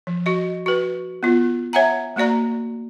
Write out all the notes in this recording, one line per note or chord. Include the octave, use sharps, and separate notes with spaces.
F3
F#4 D#5
F#4 B4
B3 F4
C#5 E5 F#5 G#5 A#5
A3 A#3 F#4 D5 A#5